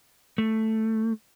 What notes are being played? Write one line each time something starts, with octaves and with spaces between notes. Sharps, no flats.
A3